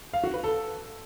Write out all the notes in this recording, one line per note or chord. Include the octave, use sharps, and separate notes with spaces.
F5
F#4
B4
A4